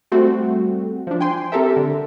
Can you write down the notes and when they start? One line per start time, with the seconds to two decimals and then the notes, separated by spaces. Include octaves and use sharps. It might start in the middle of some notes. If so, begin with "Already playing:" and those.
0.12 G3 A3 C4 F#4
1.07 F3 D4
1.20 G5 G#5 C6
1.52 C4 G4 A4 A#4 E5
1.77 D3